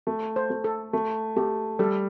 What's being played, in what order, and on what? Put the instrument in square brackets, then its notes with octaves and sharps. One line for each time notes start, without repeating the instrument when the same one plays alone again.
[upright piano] A3
[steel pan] C5
[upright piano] A3
[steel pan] A4
[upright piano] A3
[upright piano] A3 [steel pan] G4
[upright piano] G3 [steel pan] A4